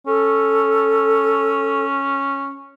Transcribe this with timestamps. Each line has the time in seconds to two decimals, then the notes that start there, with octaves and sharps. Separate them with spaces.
0.07 C#4 A4